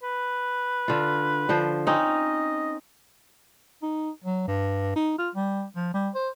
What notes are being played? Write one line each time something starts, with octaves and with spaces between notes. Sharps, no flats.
B4
D3 F4
D3 F3 C5
C4 C#4 D#4 D#5
D#4
F#3
G2
D#4
F4
G3
F3
G3
C5